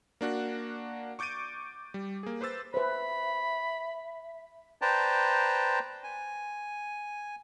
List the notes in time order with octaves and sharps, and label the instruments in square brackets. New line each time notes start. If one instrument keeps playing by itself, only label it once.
[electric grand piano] A#3 D4 F#4 F#6
C#6 D6 G6 A6 D7 D#7
G3
A#3 G#4
B4 C5 D6 E6 A6
[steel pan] B4 C5 [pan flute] E5 [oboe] B5
[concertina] B4 C5 D5 G5 A5 A#5
G#5